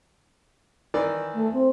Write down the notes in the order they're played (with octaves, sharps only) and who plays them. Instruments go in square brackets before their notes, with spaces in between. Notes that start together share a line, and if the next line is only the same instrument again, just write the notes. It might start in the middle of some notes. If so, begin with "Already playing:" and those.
[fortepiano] D#3 E3 D5
[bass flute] A3
C4